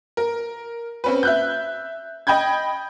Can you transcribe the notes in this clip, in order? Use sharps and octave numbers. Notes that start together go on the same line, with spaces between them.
A#4
C4 C#4 B4
E5 F#6 G6
D#5 G5 B5 G6 G#6